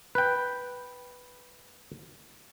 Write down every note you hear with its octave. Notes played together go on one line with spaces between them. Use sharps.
B4 G5